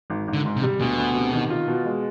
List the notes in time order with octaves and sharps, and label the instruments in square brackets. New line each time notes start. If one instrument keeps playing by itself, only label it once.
[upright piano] G#1
G#1
[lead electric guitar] D3
[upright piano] G#2
[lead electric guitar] C3
[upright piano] G3
[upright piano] D2 [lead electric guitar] B2
[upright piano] D2
C3
D#3
F4
B2
G#3